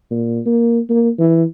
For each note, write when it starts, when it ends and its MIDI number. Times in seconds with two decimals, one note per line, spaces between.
0.11 0.40 46
0.46 0.80 58
0.90 1.10 58
1.20 1.44 52